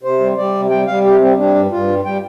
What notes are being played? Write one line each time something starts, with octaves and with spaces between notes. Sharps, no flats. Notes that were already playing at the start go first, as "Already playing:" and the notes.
C3 C5
G3
G3 D5
C3
G3 G5
G3 F5
C3 G4
G3 C4
G3 D4
G2
G2 F4
G3
G3 G5